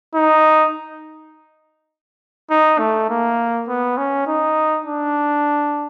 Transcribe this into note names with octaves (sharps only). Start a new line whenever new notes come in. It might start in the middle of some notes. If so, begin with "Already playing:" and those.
D#4
D#4
A3
A#3
B3
C#4
D#4
D4